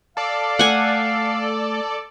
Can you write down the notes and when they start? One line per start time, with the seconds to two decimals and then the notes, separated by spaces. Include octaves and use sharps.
0.17 A4 D5 F5
0.59 A3 F#5 G#5